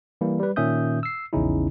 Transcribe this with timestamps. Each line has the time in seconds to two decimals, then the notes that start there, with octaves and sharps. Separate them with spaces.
0.21 E3 G3 A#3 E4
0.39 G3 B4
0.56 A#2 D#3 C#4 E5 D#6 G6
1.03 E6 C7
1.33 A#1 E2 C#3 C#4 D#4 E4